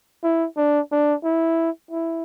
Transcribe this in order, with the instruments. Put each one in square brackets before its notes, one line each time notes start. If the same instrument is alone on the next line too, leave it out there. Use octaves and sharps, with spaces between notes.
[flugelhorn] E4
D4
D4
E4
E4